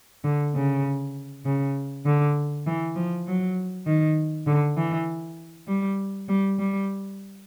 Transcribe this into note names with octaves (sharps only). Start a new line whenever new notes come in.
D3
C#3
C#3
D3
E3
F3
F#3
D#3
D3
E3
G3
G3
G3